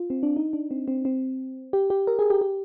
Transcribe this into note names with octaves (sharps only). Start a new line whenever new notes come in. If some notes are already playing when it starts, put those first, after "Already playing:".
Already playing: F4
C4
D4
D#4
D4
C4
C4
C4
G4
G4
A#4
G#4
G4
G4